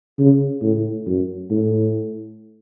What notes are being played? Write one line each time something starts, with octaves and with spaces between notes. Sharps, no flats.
C#3
A2
F#2
A2